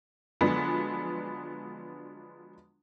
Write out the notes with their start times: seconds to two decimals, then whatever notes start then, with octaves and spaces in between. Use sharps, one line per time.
0.41 D3 F3 F#3 G#3 B3 D4